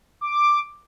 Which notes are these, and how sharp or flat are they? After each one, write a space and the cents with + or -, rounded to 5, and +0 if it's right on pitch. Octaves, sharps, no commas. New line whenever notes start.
D6 +5